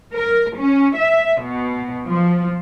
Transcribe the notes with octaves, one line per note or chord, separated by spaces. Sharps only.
A#4
C#4
E5
B2
F3